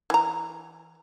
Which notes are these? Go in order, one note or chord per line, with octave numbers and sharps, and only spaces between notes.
E3 A#5